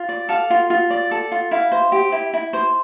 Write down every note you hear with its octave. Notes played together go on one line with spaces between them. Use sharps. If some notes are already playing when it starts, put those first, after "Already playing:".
Already playing: F4
D5
A4 F5
F4
F4
D5
A4
F4
E4 F5
C5
G4
E4
E4
C5